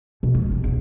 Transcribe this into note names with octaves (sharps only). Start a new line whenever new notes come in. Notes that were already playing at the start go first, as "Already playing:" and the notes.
B2
F#2 G#3
G1 C2
E1